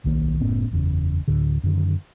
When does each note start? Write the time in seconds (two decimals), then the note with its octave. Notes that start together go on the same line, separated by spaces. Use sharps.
0.04 D1 B1 D#3 A#3
0.40 F#1 A2 B3 C#4
0.71 F#1 E2 C#3
1.28 D2 A2 D3
1.63 F#2 D3 D#3